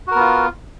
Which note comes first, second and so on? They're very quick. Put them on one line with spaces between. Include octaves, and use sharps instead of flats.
F#4 A#4 B3 F4